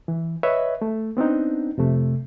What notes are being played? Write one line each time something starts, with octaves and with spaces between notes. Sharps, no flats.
E3
B4 C#5 D#5 E5
A3
B3 C4 D4 D#4
F2 C3 A3